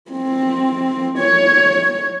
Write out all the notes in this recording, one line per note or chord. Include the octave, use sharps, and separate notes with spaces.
C4
C#5